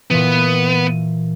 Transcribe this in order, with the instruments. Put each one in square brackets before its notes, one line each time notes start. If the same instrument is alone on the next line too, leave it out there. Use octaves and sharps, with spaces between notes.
[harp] A#2 E3 [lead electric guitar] B3